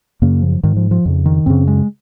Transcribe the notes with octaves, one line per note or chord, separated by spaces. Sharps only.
F#2 C#3 A#3
F3
G#2 D#3
F3
F3
F2 C#3
D#3
F#2 C#3 C4
G#3